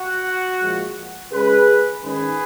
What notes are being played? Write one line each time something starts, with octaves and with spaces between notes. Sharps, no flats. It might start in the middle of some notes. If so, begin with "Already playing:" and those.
Already playing: F#4
A#2 F3 G#3
C#3 G#3 C#4 G#4 B4
G#2 D#3 G#3 C#4 G#4 B4